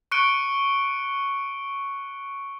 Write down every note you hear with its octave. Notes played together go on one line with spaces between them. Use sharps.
C#6 F#6 C#7 D7 G7